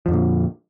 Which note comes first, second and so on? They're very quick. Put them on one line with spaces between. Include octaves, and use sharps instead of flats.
F3 F2 D3 A#2